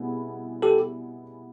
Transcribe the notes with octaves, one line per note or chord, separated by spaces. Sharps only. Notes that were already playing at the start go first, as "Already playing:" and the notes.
Already playing: B2 G3 B3 E4 G#4
G4 A4